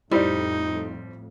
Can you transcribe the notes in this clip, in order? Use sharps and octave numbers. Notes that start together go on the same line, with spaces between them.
F2 A2 G3 C4 D#4 E4 D5